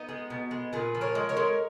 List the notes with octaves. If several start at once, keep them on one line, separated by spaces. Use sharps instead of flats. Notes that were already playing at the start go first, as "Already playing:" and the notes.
Already playing: B3 D#4
G#3
B2
G#3
A#2 G#4 B4
F3
A#4 C#5
G#3
A#4 C#5
G#3